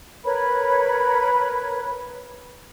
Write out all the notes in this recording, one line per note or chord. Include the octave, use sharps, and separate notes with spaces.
A#4 B4 C#5 B5